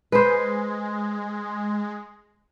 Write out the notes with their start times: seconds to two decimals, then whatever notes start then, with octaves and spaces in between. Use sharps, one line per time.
0.12 G#3 B4 C5